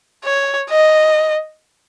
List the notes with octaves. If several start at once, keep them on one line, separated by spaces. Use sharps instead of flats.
C#5
D#5